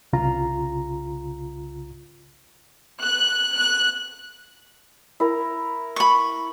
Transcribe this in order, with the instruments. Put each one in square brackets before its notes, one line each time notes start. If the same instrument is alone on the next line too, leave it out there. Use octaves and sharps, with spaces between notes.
[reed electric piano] C2 C#3 F4 A#5
[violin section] F#6
F#6
[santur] E4 A#4
[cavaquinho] B5 C#6